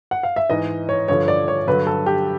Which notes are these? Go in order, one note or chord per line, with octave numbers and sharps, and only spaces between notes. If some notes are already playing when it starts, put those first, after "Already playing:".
F#5
F5
E5
G#2 E3 D#5
C#5
G2 D3 F3 C#5
D5
C#5
G2 D3 F#3 B4
A4
G4